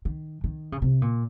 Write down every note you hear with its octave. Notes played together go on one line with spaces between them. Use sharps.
D#3
D#3
C#3
C3
A#2